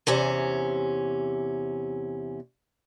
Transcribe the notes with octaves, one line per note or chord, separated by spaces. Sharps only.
E2 C3 C#4